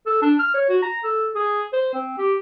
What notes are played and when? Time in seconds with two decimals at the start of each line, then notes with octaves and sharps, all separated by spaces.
0.06 A4
0.22 D4
0.39 F6
0.54 C#5
0.69 F#4
0.82 A#5
1.03 A4
1.35 G#4
1.73 C5
1.94 C4
2.18 G4